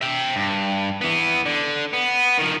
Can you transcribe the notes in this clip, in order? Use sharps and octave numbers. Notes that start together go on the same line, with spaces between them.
E5 G5
G2
E3 B3
D3
B3
D#3 F3